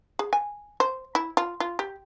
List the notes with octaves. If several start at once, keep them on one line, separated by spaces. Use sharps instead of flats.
G#4
G#5
C5
E4
F4
F4
G4